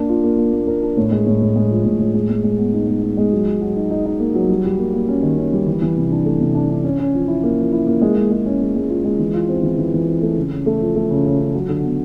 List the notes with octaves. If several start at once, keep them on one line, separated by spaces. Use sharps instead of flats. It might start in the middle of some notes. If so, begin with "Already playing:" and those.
Already playing: A#3 D4
F4
A#3
A#3
A#3
A#4
D4
A2
G#3
A2
A2
G#3
F3
A2
A2
G#3
G#3
G#3
B3
D#4
G#3
D#4
G#3
F#3
F#3
F#3
D#4
D#4
D#4
A#3
F#3
G3
G3
A#3
A#3
C#4
D#3
C#4
G3
E3
E3
C3
D4
A3
C3
D4
D4
C#4
C#4
F3
E4
A#3
F3
E4
A#3
G#3
G#3
G#3
C#4
G#3
G#3
F4
G#3
E3
F4
C4
E3
E3
E3
C4
A3
C#3
C#3
A3
F3
A3
C#3
C#3
C#3
F#3
D3
B3